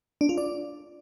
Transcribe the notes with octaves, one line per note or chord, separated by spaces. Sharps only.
D4
F4
D5